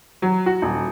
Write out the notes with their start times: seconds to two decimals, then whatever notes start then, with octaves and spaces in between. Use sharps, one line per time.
0.22 F#3
0.46 F#4
0.62 D#1